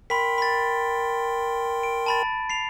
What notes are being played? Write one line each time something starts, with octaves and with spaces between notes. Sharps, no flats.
A#4 G5 B5 C6 B6
B5 A6
D7
A5 B5 A6
C7 F7